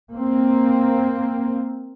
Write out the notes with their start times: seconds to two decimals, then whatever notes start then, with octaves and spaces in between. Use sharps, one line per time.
0.14 A#3 C4